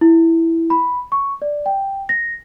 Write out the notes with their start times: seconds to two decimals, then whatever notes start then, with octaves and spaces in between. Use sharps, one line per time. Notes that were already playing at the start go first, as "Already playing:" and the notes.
0.01 E4
0.70 B5
1.12 C#6
1.42 D5
1.66 G5
2.09 A#6